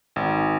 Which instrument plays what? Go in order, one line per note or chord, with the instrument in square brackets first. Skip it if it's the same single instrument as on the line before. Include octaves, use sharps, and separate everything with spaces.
[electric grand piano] G#1